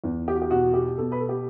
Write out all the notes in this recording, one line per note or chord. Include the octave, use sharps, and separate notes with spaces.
E2
G4
F#4
G4
B2 F#4
G4
B2 A4
B4
A4
G4